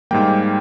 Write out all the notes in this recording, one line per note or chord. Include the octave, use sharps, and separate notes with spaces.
G#2 G3 A#3 G5